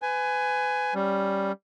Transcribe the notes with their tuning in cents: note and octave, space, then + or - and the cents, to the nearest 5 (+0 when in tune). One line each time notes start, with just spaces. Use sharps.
B4 +30 G#5 +5
G3 +0 C#4 +0